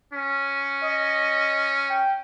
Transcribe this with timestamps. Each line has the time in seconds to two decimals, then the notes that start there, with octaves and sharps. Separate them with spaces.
0.13 C#4
0.85 D#5
1.90 G5